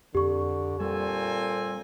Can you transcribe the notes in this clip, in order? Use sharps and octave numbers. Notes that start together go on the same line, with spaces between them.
F2 D3 G4 C#6
A#2 G3 C4 A4 G#5